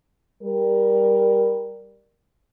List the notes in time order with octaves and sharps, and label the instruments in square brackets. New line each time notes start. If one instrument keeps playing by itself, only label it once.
[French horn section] G3 A#4